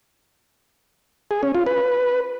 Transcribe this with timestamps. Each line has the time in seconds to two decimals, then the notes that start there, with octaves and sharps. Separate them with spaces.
1.31 G#4
1.43 C#4
1.55 F4
1.66 B4